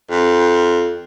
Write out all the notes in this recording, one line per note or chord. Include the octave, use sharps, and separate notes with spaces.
F2